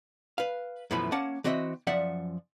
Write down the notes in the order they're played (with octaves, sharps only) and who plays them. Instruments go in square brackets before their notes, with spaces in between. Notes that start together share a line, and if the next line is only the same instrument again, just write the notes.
[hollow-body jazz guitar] B4 F5
F#2 B2 E3 F3 A3 B5
A#3 C#4 F#5 A5
E3 C4 F#4 D#5 E5
F#2 F3 D5 E5 F#5